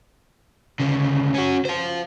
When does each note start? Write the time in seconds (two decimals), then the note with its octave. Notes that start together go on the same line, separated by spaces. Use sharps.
0.80 D2 C#3
1.34 C#4 F#4
1.65 C5 F5